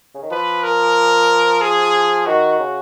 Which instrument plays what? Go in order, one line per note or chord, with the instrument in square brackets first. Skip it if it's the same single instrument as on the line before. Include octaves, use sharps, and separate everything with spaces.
[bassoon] C#3
D#3
[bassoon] F3 [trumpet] B4
[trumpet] A#4
G#4
[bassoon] D#3 [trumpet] F#4
[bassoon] C#3